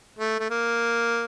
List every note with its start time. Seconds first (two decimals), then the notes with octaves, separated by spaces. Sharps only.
0.19 A3
0.39 A3
0.50 A#3